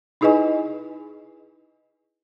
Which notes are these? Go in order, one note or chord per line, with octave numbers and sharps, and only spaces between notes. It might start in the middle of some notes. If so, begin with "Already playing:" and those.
D#4 E4 G#4 B4 D#5 G#5